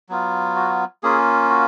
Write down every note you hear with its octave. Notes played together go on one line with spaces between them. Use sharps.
F#3 B3 F4
F#4
A#3 C#4 F4 G#4
F#4